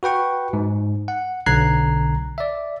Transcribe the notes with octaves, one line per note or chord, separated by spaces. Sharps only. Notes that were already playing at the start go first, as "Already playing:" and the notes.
F#4 B4 G5 C#6
G#2
F#5
B1 D3 A#5 F#6 G#6 C7
D5 E5